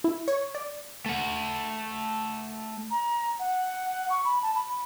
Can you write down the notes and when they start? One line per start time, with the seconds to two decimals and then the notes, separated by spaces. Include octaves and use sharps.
0.04 E4
0.28 C#5
0.55 D5
1.06 A3 F#5
2.91 A#5
3.40 F#5
4.10 C#6
4.25 B5
4.43 A5
4.55 B5